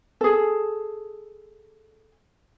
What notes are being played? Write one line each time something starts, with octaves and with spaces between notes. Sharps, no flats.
G#4 A4